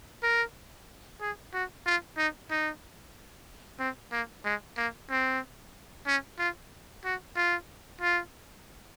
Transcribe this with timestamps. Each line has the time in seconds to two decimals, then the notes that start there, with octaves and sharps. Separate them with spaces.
0.23 A#4
1.21 G#4
1.54 F#4
1.86 F4
2.18 D#4
2.51 D#4
3.79 C4
4.12 A#3
4.45 G#3
4.77 A#3
5.10 C4
6.07 C#4
6.39 F4
7.05 F#4
7.36 F4
8.01 F4